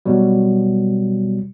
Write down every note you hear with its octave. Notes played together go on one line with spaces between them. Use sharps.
B2 F#3 G3